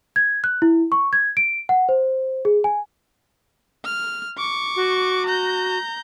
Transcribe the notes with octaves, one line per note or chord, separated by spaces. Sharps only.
G#6
F#6
E4
C#6
G#6
D7
F#5
C5
G#4
G#5
F6
C#6 D6
F#4
A#5 G6